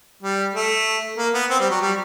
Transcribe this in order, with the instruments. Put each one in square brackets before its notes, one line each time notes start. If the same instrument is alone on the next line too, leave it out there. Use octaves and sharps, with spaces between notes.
[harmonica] G3
A3
A#3
B3
C4
G3
F#3
G3